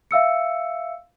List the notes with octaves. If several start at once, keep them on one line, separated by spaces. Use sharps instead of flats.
E5 F5 E6 C#7